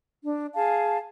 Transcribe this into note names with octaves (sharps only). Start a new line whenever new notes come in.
D4
G#4 F5 A5